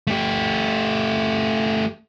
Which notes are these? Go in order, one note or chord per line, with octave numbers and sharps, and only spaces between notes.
A3 G4